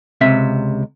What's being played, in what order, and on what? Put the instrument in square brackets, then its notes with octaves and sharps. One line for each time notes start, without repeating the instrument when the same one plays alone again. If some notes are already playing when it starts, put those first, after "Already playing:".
[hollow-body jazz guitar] C#2 C3 E5